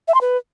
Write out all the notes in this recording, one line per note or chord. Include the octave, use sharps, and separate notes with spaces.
E5
C6
B4